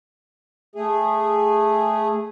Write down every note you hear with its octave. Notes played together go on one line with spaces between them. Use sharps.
A3 G#4